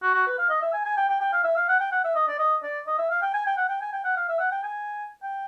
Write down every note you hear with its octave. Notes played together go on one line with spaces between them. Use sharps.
F#4
F#4
B4
F5
D#5
E5
G#5
G#5
G5
G5
G5
F5
E5
F5
F#5
G5
F#5
E5
D#5
D5
D#5
D5
D#5
E5
F5
G5
G#5
G5
F#5
G5
G#5
G5
F#5
F5
E5
F#5
G5
G#5
G5